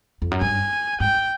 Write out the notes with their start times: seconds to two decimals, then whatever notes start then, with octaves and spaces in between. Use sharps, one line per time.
0.22 F2
0.31 F#2
0.41 G2 G#5
1.00 G#2 G5